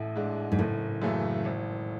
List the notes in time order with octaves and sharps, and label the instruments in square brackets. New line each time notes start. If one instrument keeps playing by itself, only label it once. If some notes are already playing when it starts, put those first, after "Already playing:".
Already playing: [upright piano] A1 [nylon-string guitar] A2
[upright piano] G#2 G#3 D4
[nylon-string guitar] G#2
[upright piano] F#1 [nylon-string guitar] A2
[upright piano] F#2 C#3 E3 A3
G#1